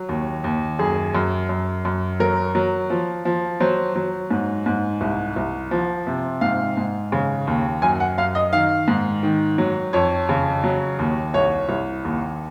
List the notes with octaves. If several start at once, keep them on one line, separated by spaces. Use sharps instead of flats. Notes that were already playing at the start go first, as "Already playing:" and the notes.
Already playing: F#3
D#2
D#2
F#2 G#4
F#2
F#2
F#2
F#3 A#4
F#3
F3
F3
F#3 C5
F#3
G#2
G#2
C2
C2
F3
C3
G#2 F5
G#2
C#3
D#2
F#2 G#5
F#5
F#2 F5
D#5
D#3 F5
G#2
D#3
F#3
F2 C#5
C#3
F#3
D#2
C2 C#5
C2
D#2